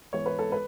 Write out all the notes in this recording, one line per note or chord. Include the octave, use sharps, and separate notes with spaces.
G#2 E3 B3 C#5
B4
A4
B4